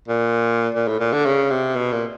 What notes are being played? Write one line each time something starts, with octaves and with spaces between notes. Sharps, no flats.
A#2
A#2
A2
A#2
D3
C#3
C3
B2
A#2